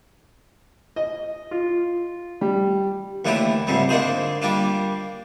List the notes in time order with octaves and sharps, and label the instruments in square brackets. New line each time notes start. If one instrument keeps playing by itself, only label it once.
[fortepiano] D#5
F4
G3
[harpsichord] D#2 D3 E3 A3 E4 G4
C#2 G#2 C3 G3
D3 A#3 D#4 G#4 C5
G3 A#3 D4 F4